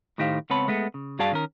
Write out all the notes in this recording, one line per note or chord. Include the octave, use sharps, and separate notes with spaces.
A2 D#3 D#4 G4 C5 F5
C#2 B3 C4 C#5 A5 B5
G#3 A3 B3
C#3
G2 F#4 G#4 D5 F5 A5
D#3 C#4 A#4